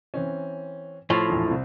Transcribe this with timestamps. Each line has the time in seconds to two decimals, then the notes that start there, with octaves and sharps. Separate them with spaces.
0.14 E3 C4 C#4
1.10 A2 F3
1.29 A#1 E2
1.47 C2 C4